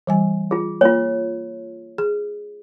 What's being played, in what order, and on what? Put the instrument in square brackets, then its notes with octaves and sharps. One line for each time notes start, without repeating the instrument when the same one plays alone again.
[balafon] E3 G3 G#5
[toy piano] F4 G#4
[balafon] A#3 [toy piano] F4 C#5
[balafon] G#4